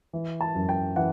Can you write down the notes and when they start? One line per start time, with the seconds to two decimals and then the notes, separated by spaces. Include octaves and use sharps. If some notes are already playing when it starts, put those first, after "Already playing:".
0.13 E3
0.41 A5
0.55 F#2
0.69 G5
0.96 E3 F#5